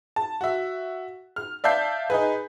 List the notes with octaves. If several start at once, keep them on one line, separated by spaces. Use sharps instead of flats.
A5
F#4 E5
F6
D5 E5 F5 A5 G6 C7
D#4 G#4 B4